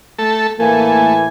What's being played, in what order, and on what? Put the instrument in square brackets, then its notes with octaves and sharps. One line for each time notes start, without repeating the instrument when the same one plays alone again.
[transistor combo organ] A3 A4
[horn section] A2 E3 G#5 [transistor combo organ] A3 [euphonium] A#3